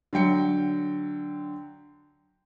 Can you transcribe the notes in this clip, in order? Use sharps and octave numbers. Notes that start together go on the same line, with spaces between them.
D3 F#3 G5 C#7